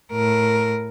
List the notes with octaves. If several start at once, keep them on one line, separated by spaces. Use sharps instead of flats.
A2 A#4